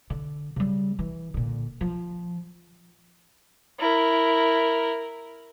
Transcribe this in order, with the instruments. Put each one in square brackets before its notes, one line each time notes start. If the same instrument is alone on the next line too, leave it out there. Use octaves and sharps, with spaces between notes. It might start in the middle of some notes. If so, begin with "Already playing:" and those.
[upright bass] D3
C#3 G3
E3
A#2 D3
F3
[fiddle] E4 A#4